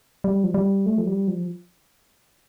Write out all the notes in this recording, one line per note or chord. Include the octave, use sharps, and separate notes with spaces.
G3
F3
G3
A3
F3
G3
F3